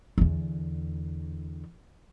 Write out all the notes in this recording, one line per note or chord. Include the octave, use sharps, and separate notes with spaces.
E2 D3